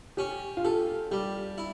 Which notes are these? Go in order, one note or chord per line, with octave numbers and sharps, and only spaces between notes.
C#4 G4
F4
G4 A4
G3 G4
E4